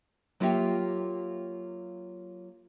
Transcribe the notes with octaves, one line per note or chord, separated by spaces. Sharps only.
F#3 A#3 F4 G4 E5 G5